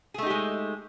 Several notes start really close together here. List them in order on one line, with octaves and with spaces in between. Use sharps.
G#4 A3 D#4 G4 G#3